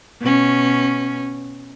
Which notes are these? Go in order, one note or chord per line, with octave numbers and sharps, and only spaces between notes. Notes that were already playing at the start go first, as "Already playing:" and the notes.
B2 C#4